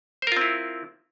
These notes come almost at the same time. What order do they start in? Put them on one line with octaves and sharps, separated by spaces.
C5 A#4 F4 C4 E4